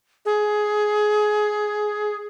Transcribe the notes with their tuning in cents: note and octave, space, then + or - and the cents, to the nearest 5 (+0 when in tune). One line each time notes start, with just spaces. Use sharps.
G#4 +15